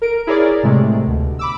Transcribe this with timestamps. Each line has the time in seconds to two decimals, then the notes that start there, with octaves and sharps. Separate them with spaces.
0.02 A#4 D7
0.27 E4 G#4 A#4 C#5 D5
0.63 A2 C3 G#3 A3
1.07 D2 B2
1.39 B5 D6 E6